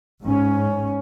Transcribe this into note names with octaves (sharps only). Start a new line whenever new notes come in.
G#2 C#4